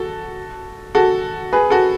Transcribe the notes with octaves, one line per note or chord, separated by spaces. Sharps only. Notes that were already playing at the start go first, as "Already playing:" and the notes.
Already playing: F#4 A4
F#4 A4
G#4 B4
F#4 A4